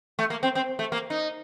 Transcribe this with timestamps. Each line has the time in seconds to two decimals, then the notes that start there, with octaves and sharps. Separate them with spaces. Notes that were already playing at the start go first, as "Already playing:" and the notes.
0.19 A3
0.30 A#3
0.43 C4
0.55 C4
0.79 A3
0.92 A#3
1.10 D#4